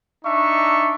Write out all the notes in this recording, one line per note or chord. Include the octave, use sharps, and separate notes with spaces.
D4 D#4 E5 C#6